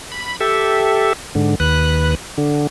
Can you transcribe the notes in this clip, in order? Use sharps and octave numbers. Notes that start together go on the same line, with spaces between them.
B5
G4 A4 E5
G#2 D3
D#2 B4 F#6
D3